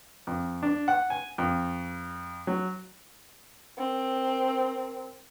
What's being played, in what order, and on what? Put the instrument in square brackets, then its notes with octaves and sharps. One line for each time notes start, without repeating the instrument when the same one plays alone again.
[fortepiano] F2
D4
F#5
G#5
F2
F#3
[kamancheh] C4 A#4